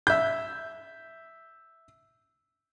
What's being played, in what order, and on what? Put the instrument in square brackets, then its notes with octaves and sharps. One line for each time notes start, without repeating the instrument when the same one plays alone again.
[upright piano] E5 G6